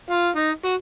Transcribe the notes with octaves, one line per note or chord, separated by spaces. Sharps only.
F4
D#4
F#4